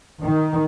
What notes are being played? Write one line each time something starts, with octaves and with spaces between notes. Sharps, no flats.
D#3